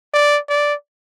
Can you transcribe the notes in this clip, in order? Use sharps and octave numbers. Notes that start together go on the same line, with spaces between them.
D5
D5